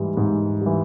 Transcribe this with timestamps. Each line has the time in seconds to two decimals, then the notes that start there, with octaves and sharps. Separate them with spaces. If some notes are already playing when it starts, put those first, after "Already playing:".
Already playing: G#2 E3 G3
0.17 G#2
0.61 E3 G3